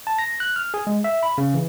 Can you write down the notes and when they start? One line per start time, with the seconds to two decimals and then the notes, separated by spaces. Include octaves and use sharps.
0.07 A5
0.19 A#6
0.40 F#6
0.56 F6
0.74 G#4
0.87 G#3
1.04 E5
1.23 B5
1.38 C#3
1.54 E3